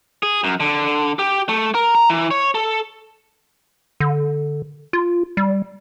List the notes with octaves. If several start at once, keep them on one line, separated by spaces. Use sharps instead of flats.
G#4
F#2
D3
G4
A3
A#4
A#5
E3
C#5
A4
D3
F4
G3